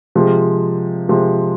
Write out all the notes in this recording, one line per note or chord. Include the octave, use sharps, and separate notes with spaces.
C3 F3 G#3
C3 F3 G#3